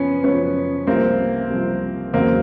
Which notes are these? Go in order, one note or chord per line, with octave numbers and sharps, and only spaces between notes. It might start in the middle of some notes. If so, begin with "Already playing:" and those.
Already playing: F#2 C#3 F3 B3 C#4
F#2 C#3 F3 B3 C#4
C2 C3 F3 A#3 C4
C2 C3 F3
E2 C#3 F#3 A#3 C4